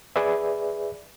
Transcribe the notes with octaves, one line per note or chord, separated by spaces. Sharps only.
G#4 B4 D5 E5